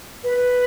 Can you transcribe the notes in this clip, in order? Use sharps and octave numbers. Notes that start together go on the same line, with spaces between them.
B4